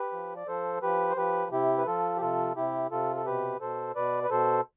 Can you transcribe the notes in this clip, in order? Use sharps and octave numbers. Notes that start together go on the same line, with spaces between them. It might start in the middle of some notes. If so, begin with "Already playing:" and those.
Already playing: G4 B4
F3
D5
F3 A4 C5
F3 G4 B4
C5
F3 G4 B4
C3 E4 G4
B4
F3 F4 A4
G4
C3 F4 A4
C3 E4 G4
C3 F4 A4
A4
B2 G4 B4
B2 A4 C5
B2 B4 D5
B4
B2 A4 C5